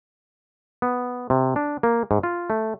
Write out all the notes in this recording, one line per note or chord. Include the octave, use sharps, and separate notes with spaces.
B3
C3
D4
A#3
G#2
F4
A3